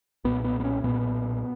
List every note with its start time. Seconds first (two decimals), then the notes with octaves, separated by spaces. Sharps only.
0.24 B1 A#2 B3
0.44 B3
0.60 B3
0.64 C#4
0.83 B1 A#2 B3